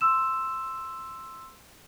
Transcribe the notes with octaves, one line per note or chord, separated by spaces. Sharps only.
C6 E6 E7